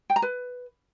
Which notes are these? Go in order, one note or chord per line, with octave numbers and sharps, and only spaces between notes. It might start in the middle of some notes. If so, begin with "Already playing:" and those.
G5
A#5
B4